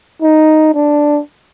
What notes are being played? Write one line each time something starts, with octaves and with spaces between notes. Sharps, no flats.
D#4
D4